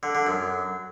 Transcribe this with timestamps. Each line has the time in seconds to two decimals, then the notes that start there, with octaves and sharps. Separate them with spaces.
0.03 D3
0.15 D3
0.27 F#2